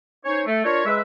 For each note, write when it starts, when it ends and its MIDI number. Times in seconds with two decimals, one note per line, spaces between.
0.25 0.42 61
0.25 0.42 63
0.25 0.42 72
0.25 0.42 73
0.47 0.61 57
0.65 0.83 62
0.65 0.83 65
0.65 0.83 70
0.65 0.83 73
0.86 1.00 56
0.86 1.00 71
0.86 1.00 76